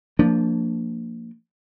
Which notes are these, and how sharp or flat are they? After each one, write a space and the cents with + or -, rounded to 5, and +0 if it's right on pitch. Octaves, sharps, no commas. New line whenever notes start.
F3 +0 A#3 -20 D4 +0